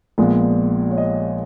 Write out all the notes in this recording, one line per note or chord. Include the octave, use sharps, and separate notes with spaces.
A#1 A#2 G#3 B3
C#5
D#5